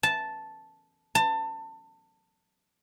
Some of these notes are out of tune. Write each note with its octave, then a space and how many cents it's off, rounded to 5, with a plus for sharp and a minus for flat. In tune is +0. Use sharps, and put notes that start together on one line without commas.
A5 -5
A5 +25